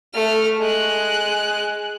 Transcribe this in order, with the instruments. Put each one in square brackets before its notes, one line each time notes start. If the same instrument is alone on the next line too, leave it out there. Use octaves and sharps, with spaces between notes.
[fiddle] A3 F6
G#3 F#6